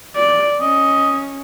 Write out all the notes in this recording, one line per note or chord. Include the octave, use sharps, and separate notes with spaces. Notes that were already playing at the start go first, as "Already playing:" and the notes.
D5
C#4 D#5